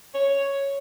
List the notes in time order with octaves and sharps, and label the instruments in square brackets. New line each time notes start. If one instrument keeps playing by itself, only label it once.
[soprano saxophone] C#5